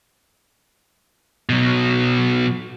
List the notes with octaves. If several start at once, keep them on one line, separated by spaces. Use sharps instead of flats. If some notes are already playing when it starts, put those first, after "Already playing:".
B2 F#3